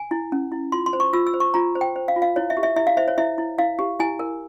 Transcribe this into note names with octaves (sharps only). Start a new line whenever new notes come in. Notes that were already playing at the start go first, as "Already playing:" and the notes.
Already playing: G#5
E4
C#4
E4
F4 C6
C6
C5
C#6
F4 E6
E6
C5
C#6
F4 A#5
C5
G5
C5
F5
F4
F5
E4 C#5
E5
G4
E5
E4 E5
F5
C5 E5
C#5
E4 E5
E4
E4 F5
G4
E4 G#5
A#4